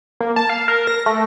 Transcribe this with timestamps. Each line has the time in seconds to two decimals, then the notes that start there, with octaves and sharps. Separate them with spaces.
0.21 A#3
0.36 A5
0.49 F5
0.68 A#4
0.87 A#6
1.06 A3